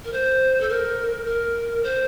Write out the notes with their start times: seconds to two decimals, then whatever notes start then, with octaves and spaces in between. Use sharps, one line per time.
0.05 A#4
0.12 C5
0.60 A4
0.69 A#4
1.26 A#4
1.83 C5